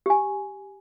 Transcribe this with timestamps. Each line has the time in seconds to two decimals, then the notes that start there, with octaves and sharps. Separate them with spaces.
0.06 G4 G#5